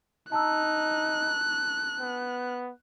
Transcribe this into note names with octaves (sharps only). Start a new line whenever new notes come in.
D#4 A5 A#5 E6 F#6
B3